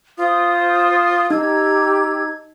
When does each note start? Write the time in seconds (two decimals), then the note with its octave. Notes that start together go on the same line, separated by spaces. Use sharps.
0.18 F4 C5 D#6
1.30 D#4 G4 A#5 E6 G#6